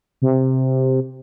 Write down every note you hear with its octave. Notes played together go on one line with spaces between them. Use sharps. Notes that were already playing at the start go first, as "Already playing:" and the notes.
C3